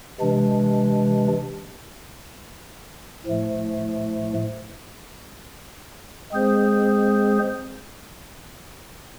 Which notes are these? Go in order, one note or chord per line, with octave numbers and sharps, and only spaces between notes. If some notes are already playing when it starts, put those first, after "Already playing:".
C3 E3 G#3 D4
A2 F3 A3
G#3 C4 G#4 C5